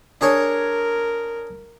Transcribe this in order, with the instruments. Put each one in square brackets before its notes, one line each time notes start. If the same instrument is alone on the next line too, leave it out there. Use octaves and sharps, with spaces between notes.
[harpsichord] D4 G#4 C#5 [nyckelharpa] A#4